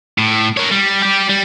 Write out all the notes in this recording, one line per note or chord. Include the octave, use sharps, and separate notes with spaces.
A2
A#4 C#5
G3
G4 D5
G3